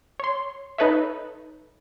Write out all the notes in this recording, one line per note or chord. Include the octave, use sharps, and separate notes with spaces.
C#5 C6
D#4 A4 B4 C#5 E5